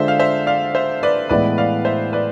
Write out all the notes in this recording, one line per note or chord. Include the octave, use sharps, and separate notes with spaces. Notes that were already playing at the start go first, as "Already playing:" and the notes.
Already playing: D3 G#3 D4 F4 C5 E5
F5
C5 E5
D5 F5
C5 E5
B4 D5
A2 E3 G#3 B3 E4 B4 D5
D5 F5
C5 E5
B4 D5